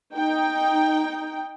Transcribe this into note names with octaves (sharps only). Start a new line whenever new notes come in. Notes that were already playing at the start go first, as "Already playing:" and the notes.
D#4 G5